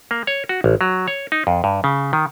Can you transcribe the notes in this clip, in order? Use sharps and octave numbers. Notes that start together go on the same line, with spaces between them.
A#3
C#5
F#4
A1
F#3
C#5
D#4
F2
G2
C#3
D#3